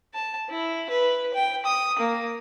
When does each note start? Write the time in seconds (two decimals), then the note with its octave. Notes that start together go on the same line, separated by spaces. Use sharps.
0.14 A5
0.50 E4
0.90 B4
1.34 G5
1.66 D#6
1.99 A#3